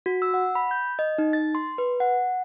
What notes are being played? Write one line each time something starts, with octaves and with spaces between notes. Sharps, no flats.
F#4
E6
F#5
B5
G6
D#5
D#4
A6
C6
B4
F#5